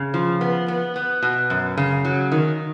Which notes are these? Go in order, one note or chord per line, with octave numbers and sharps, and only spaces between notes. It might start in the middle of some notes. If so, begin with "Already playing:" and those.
Already playing: C#3
F3
B3
B3
B3
B2
F#2
C#3
F#3
D#3